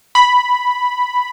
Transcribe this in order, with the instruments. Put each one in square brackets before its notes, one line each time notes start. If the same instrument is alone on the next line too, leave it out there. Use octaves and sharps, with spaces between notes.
[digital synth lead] B5